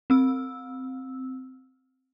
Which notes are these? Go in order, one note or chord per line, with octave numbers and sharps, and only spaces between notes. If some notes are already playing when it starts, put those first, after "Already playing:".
C4 E6